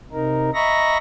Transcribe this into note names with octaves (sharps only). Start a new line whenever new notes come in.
C3 D#4 A#4
D#5 E5 A#5 B5 C#6 A#6